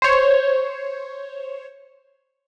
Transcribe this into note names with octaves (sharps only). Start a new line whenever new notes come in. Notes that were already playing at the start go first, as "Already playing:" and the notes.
C5 C#5